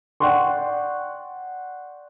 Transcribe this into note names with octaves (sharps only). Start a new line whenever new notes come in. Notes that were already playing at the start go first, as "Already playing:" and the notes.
D5 F#5 G5 C6 C#6